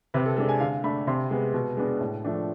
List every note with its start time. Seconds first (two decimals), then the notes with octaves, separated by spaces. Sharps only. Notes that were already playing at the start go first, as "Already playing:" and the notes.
0.14 C3 B4
0.26 A4
0.37 G#3 D4 A4
0.49 G#5
0.60 D3 F5
0.84 A3 D4 B5
1.07 C3 C6
1.31 G#3 B3
1.54 B2
1.77 G#3 B3 D4
2.01 A2
2.24 F3 A3 D4